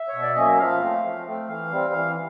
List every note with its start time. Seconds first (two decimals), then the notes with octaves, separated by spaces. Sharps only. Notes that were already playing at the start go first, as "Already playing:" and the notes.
Already playing: E5
0.08 C#5
0.14 B2
0.22 D5
0.34 F#3 A#3 C#4 D#5
0.46 E5
0.59 F3 F5
0.81 A3 C4
1.04 F3
1.27 A3 C4
1.49 E3 F5
1.71 G3 C4
1.94 E3